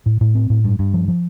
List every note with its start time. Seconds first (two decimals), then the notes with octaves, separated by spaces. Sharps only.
0.06 A2
0.21 A2
0.35 C4
0.50 A2
0.64 G2
0.79 G2
0.94 F3
1.08 F3